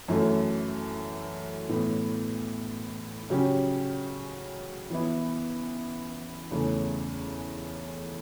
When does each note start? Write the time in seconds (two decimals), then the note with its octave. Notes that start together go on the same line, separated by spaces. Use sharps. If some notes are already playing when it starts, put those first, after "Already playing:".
0.08 F#2 E3 A3
1.69 A2 E3 B3
3.30 C#3 F#3 C#4 G4
4.90 E3 B3 E4
6.51 E2 C#3 E3 A3